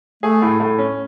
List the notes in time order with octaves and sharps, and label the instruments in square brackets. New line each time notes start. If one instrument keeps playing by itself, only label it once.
[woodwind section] A3 [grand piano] G#4
[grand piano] A2
A2
C#4